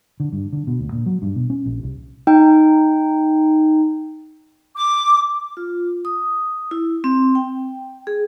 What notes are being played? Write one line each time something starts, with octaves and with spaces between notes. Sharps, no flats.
D3
G2
D3
B2
D2
A#2
F#3
G2
B2
C#4
A#1
C2
D#4 G5
D6
F4
D#6
E4
C4
G5
G#4